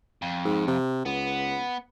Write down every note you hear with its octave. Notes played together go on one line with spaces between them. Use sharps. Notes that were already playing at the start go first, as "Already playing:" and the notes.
F2
G#2
C3
C#2 B3